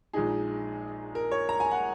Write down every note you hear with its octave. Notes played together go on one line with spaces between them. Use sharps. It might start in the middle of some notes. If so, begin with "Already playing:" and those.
A#1 A#2 G#3 D#4 G#4
A#4
C#5
A#5
G#5
F#5